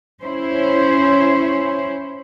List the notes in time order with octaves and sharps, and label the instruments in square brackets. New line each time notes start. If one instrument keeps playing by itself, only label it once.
[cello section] C#4 E4 C5